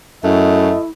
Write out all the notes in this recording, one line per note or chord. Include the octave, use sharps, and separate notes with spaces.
F#2 A3 E4 D#5